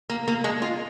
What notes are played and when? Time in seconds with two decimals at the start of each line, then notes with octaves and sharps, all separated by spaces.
0.10 A#3
0.28 A#3
0.44 G#3
0.62 F4